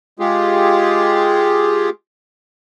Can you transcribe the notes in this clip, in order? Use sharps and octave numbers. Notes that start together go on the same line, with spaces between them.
G#3 F4 G4 G#4